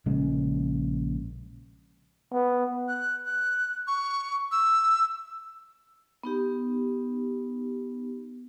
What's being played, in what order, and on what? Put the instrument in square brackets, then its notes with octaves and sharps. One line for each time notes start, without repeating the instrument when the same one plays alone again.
[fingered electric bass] A#1 C#3 G#3
[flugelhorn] B3
[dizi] F#6
F#6
C#6
E6
[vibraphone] B3 D#4 G4